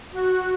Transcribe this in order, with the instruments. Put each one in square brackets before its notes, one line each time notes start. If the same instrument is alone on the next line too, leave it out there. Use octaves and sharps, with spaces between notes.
[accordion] F#4